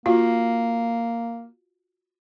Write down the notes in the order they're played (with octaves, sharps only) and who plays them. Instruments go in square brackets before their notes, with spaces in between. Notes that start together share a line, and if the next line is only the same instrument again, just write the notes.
[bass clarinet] A#3 [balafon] F4 F#4 F5